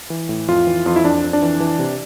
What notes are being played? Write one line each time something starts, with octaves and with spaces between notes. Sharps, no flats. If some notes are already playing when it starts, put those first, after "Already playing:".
E3
A2
F2 F4
E3
F2 F4
E4
F2 D4
F2
D4
E3
E3
C3